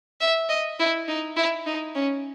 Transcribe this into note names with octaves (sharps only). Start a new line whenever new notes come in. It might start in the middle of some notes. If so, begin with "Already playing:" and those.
E5
D#5
E4
D#4
E4
D#4
C#4